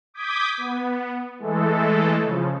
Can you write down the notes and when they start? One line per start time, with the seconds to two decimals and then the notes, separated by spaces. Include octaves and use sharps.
0.14 D6 D#6 G6 G#6 B6
0.57 B3
1.39 E3 G#3 A3 A4
2.23 C#3 F3